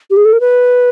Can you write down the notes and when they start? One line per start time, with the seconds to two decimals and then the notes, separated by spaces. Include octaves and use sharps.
0.11 G4
0.17 G#4
0.25 A4
0.33 A#4
0.40 B4